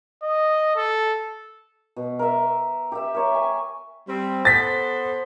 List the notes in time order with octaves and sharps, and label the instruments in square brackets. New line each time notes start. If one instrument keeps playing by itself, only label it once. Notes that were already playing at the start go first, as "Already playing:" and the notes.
[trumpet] D#5
A4
[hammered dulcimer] B2
A#4 E5
G4 A#4 E5
A#4 C#5 E5
G#5
[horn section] G3 C4
[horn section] B3 A4 C5 [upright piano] A6 B6